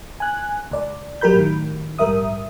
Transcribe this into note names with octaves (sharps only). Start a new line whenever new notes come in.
G#5 F#6
C#2 D5
G#1 F#3 G4 A#4 B5 G6
A2 D#3
A#1 G#2 G3 A#4 E5 D#6